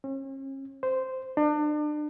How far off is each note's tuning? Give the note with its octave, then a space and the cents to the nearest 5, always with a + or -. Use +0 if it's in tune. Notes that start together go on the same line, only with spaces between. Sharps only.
C#4 -40
C5 -10
D4 +35